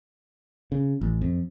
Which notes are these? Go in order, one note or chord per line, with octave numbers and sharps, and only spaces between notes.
C#3
A1
F2